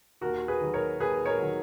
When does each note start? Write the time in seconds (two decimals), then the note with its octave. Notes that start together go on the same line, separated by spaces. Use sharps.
0.21 D#2 F#4 A#4
0.48 G#4 B4
0.61 D#3 F#3
0.74 A#4 C#5
1.00 D#2 G#4 B4
1.26 A#4 C#5
1.39 D#3 F#3